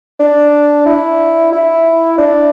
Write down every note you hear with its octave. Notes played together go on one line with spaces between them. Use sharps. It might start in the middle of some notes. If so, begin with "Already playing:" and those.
D4
E4
E4
D4